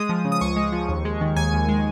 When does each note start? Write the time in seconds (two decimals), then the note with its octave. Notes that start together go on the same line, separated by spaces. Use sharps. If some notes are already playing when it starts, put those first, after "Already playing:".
Already playing: G#3 D#6
0.09 F3
0.25 C#3
0.32 D#6
0.41 C#2 C#6
0.56 G#3
0.72 F3
0.89 D#2
1.05 G#3
1.21 D#3
1.36 D#2 G#5
1.53 D#2
1.69 G#3